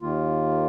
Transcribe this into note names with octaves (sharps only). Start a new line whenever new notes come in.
D#2 D#3 A#3 F4